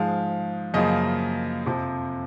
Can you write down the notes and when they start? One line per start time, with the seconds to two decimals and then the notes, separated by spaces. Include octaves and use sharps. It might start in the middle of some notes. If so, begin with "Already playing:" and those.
Already playing: G#2 F3 G#3 F5
0.74 F#2 C#3 F3 A#3 D#5
1.66 F2 C3 F3